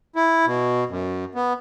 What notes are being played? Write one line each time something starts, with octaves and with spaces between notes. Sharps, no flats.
E4
B2
F#2
B3